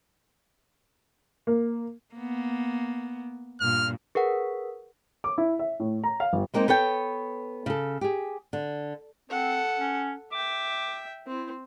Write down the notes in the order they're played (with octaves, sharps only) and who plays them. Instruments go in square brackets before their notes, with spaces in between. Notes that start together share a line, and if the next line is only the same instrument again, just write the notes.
[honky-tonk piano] A#3
[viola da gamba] A#3 B3
[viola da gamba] G2 A#2 [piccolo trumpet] F6
[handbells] G#4 A#4 B4 F#5
[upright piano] D6
E4
E5
A2
A#5
F5
G1
[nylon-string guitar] G#3 A#3 C4 D#4
B3 A4 C#5 G5
C#3 A4
G4 G#4
D3
[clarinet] C4 [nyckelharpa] A4 F#5
[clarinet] C#4
[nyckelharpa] E5 G5 [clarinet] D6
[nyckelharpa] C4 [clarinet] E4